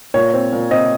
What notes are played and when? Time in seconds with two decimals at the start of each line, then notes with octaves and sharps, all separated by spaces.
0.14 A#2 C#5
0.33 C4
0.52 A#2
0.71 C4 D#5